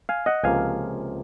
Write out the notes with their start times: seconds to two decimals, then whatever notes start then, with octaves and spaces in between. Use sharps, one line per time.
0.09 F5 G#5
0.26 D#5 F#5
0.44 C#2 C3 F3 A#3 F5 G#5